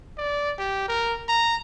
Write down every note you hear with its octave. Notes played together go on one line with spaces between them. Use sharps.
D5
G4
A#4
A#5